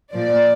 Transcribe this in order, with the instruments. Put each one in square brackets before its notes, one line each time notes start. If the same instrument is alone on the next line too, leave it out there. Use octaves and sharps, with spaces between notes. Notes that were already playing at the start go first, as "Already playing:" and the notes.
[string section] A#2 F3 D5